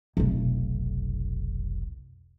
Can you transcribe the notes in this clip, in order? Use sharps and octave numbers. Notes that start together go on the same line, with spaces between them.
F1 B1